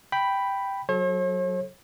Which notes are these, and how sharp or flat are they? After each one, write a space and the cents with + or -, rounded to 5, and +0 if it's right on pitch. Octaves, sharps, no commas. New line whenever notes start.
G5 +0 B5 +0
F#3 +0 A4 -25 C#5 -45